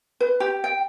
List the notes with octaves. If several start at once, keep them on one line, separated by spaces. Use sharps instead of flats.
B4
G4
G5